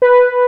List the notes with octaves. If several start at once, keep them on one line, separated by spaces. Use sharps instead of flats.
B4